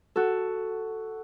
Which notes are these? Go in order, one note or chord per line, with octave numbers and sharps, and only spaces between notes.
F#4 A4